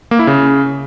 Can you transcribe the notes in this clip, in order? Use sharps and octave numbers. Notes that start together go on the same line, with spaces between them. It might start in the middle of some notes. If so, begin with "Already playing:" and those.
A#3
E4
C#3